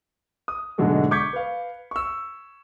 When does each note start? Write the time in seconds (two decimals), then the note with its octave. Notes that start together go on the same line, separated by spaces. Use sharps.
0.48 D#6
0.78 G#2 B2 D3 F#3 G#3 A3
1.11 C#6 D6 G6 G#6 B6 C#7
1.33 B4 F5
1.91 C#6 E6